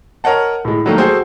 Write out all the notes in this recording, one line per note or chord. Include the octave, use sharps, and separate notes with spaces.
A#4 C#5 D#5 F#5 A5
A2 G#3
D#3 F#3 G3 A3 A#3 D#4
F#4 G#4 A4 C5 G5